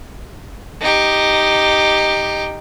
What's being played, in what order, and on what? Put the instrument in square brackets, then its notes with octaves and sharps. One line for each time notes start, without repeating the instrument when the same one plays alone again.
[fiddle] D#4 G4